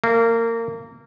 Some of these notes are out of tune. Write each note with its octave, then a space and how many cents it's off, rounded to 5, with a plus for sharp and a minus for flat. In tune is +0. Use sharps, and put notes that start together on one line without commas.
A#3 -25